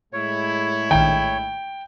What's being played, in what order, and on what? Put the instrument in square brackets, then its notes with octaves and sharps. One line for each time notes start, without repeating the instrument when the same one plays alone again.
[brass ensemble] A2 G#3 E4 [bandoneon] C#5
[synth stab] A#1 D#3 [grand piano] G5